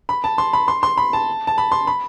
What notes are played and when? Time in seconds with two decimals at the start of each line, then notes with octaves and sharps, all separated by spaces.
0.09 B5
0.24 A5
0.38 C6
0.53 B5
0.68 C6
0.83 C6
0.97 B5
1.13 A5
1.47 A5
1.58 B5
1.72 C6
1.87 B5